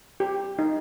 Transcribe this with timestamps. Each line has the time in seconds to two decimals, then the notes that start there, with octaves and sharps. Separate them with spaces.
0.20 G4
0.59 D#4